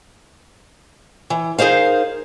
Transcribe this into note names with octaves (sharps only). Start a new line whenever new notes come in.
E3
D#4 G#4 A#4 C5 F5